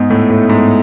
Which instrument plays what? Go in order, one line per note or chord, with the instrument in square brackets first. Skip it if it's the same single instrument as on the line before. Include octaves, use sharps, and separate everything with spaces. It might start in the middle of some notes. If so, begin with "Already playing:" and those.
Already playing: [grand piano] G#2 G#3 [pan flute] B3
[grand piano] A2 A3
A2 A3
G#2 G#3